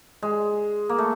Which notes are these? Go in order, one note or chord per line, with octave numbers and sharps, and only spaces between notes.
G#3
A#3
A3